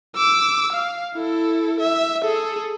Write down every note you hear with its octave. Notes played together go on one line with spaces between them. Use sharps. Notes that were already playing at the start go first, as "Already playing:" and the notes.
D6 E6
F5
E4 A4
E5
G#4 A4